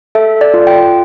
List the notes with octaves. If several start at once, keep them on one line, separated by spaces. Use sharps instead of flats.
A4 E5
D5
F4
G5